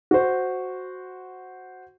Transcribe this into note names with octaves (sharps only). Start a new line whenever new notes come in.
F#4 C5